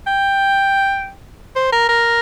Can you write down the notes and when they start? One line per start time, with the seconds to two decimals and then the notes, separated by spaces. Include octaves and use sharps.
0.07 G5
1.56 C5
1.72 A#4
1.89 A#4